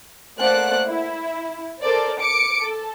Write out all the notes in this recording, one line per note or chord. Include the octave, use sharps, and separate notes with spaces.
A3 A#3 C5 D5 F#5 F#6
E4
A4 A#4 C5 D5
D6 C#7 D7
A4